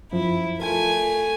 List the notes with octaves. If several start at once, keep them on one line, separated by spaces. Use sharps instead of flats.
F#2 F3 E4
A3 F4 A#4 G#5